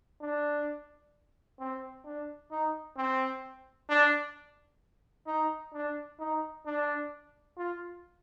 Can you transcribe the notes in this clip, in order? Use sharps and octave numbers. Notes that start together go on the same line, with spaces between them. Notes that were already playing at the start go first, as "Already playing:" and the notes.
D4
C4
D4
D#4
C4
D4
D#4
D4
D#4
D4
F4